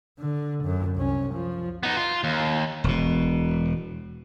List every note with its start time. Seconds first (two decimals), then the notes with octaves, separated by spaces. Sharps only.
0.19 D3
0.64 F#2
0.96 C2 C#4
1.34 F3
1.83 B3 D#4
1.97 F4
2.24 D#2
2.84 E1 B2